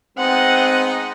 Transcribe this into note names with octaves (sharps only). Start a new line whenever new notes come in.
G#3 B3 C4 D#4 F#5